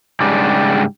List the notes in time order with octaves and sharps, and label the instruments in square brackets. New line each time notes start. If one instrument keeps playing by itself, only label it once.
[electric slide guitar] G#2 C#3 G3 D4 G4